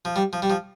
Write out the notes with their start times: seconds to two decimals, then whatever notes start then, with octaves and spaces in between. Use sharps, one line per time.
0.05 F3
0.16 G3
0.33 F3
0.42 G3
0.50 F3